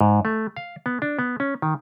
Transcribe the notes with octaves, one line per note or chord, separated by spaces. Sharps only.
G#2
A3
F5
B3
D4
B3
C#4
D#3